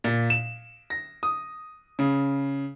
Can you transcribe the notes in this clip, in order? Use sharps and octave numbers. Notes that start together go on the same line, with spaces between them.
A#2
E7
A#6
D#6
C#3